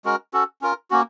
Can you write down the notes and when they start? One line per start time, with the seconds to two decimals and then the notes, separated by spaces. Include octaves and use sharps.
0.05 G#3 C#4 F#4 A#4
0.33 C#4 F#4 A4
0.62 C#4 F4 A#4
0.91 A#3 C#4 F#4